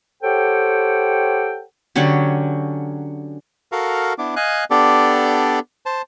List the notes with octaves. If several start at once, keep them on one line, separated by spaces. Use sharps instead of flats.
G4 A4 C5 C#5 F#5 G5
D3 F#3 C#4 G4
F#4 A4 A#4 F5
B3 D4 E4 D6
D#5 F5 G#5 F#6
B3 D4 G4 A4 D5
C5 A5